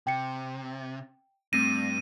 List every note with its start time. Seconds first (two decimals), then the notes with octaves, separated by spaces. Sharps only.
0.07 C3 G5 C#7
1.53 G2 A3 C4 A#6 D#7